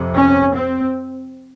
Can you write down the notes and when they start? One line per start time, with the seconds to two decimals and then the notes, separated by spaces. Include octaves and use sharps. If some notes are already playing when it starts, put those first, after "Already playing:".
Already playing: F2 C3
0.16 C#4
0.54 C4